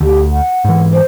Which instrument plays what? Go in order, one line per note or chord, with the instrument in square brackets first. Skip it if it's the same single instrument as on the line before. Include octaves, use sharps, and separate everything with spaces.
[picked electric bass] D2 [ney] G4
[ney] F#5
[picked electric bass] G#2 E3
[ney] C5